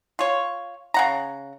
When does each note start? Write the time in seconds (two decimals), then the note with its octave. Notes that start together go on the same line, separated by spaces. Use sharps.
0.19 F4 C#5
0.94 C#3 F#5 A#5